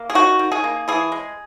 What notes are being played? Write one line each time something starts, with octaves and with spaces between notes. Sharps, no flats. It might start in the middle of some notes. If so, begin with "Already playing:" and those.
Already playing: A#3
G#4
D#3 F#4
D#3
G#4
A#3
E3 G#4
G#3